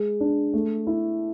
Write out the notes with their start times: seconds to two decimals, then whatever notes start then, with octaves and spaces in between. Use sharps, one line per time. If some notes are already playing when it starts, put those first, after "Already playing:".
Already playing: G#3
0.20 D4
0.54 A3
0.87 E4